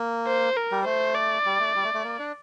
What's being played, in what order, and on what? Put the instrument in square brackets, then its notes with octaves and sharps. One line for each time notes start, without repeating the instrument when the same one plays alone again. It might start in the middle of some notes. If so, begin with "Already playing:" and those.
Already playing: [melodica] A#3
[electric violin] C5
A#4
[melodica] G3
[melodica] A3 [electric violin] C5
[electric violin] D5
[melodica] G3
A3
G3
A3
A3
A#3
D4